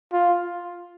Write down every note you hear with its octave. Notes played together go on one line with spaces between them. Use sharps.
F4